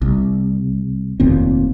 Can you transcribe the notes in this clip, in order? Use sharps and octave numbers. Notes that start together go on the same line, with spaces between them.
C2
F1 D#2 A#2 C4